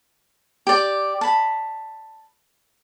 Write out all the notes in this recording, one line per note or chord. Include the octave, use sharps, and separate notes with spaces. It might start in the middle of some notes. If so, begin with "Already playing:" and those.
G4 D5
A5 B5